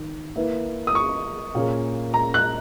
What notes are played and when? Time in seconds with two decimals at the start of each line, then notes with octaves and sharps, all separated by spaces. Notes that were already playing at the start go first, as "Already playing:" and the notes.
Already playing: D#3
0.36 A#3 E4 B4
0.87 D#6
0.95 C#6
1.55 A#2 A#3 C#4 G#4
2.14 A#5
2.34 F#6